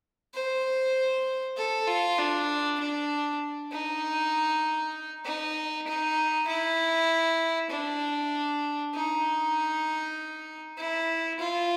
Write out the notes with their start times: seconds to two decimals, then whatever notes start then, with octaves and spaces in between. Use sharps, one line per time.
0.34 C5
1.57 A4
1.87 F4
2.19 D4
2.80 D4
3.72 D#4
5.25 D#4
5.87 D#4
6.48 E4
7.71 D4
8.94 D#4
10.77 E4
11.39 F4